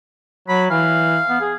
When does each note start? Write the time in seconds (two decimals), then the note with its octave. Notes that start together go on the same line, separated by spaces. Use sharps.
0.48 F#3 B5
0.71 E3 F5
1.29 B3
1.41 G#4